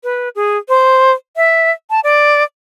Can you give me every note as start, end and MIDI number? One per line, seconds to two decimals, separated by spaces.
0.04 0.29 71
0.35 0.57 68
0.69 1.12 72
1.36 1.71 76
1.90 2.00 81
2.04 2.43 74